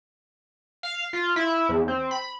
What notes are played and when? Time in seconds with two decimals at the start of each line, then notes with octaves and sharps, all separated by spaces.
0.83 F5
1.13 F4
1.36 E4
1.69 E2
1.88 C4
2.11 B5